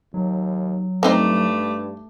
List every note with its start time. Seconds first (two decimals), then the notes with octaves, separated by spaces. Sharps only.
0.14 D#2 F#3
1.03 G2 A3 C4 D#4 C5 D6